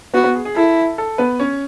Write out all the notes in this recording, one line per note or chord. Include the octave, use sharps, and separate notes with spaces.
B3 F#4 B4
B3 B4
G#4
G#4
E4 A4
A4
B3 B4
C#4 C#5